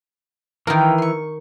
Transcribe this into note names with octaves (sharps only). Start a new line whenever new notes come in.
D#3 E3 A#4 F5 G5
C6 C#6